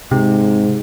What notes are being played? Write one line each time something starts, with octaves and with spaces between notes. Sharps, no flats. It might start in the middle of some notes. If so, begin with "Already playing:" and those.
G#2 C3